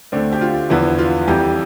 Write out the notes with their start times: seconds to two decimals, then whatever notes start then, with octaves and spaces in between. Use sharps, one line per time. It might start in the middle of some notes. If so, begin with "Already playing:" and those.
0.12 D2 D3 A3 C4 D5
0.32 G4
0.41 F4
0.70 E2 D3 F3 B3 E4
0.98 F4
1.28 F2 E3 G3 G4